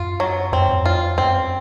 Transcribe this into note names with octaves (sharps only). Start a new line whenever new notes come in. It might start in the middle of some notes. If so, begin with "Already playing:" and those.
Already playing: F#2 F4
F#3
F2 C4
F#2
F2
F4
F#2 C4